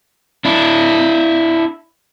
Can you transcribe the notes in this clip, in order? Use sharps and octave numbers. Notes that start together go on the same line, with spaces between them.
D4 E4